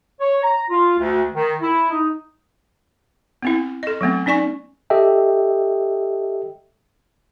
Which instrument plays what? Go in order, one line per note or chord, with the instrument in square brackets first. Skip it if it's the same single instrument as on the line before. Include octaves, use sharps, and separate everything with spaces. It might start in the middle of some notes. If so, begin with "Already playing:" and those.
[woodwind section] C#5
A#5
F4
D2
D#3
E4
D#4
[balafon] B3 C4 E4
A4 D#5
F#3 A3 B3 C4
C#4 D#4 D5 G#5 C#6
[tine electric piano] G4 A4 D#5 E5 G5